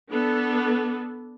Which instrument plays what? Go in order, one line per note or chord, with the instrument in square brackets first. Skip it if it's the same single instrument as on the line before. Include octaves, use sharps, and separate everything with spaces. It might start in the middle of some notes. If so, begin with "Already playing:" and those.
[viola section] B3 D4 A4